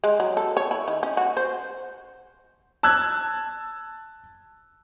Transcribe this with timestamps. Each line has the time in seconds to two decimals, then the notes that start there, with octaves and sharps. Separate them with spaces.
0.04 G#3
0.20 F#3
0.37 A4
0.57 C#5
0.71 E4
0.88 D#3
1.03 C#4
1.17 F#4
1.37 C5
2.83 A5 E6 F#6 G#6